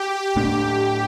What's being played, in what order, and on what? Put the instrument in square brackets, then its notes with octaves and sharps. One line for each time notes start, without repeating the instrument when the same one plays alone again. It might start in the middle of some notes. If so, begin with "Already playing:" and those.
Already playing: [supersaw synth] G4
[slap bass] A2 A3 D4